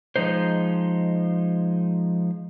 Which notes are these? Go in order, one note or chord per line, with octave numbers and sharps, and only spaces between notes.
F3 G#3 D#4 C5